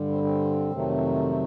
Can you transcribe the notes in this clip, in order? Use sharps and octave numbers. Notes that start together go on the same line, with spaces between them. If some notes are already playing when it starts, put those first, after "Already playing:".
Already playing: G2 D3 G3
C4
C4
F2 C3 D#3 F#3 A3